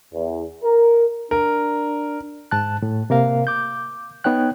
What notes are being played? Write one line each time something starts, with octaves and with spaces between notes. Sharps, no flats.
E2
A#4
D4 A#4
G#2 A5 F#6
A2
C3 A#3 A#4 F5
D6 G6
B3 D#4 C#5 G5 F#6